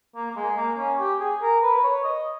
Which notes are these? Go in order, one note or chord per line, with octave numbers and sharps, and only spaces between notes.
A#3
A#3
G#3
A#3
C#4
G4
G#4
A#4
B4
B4
C#5
D#5